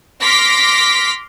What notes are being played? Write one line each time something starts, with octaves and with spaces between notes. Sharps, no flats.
C6 D6 F6 A#6 B6